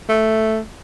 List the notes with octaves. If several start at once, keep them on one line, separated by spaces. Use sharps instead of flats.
A3